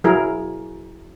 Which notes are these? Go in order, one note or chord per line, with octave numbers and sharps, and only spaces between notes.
F#3 E4 G#4 A#4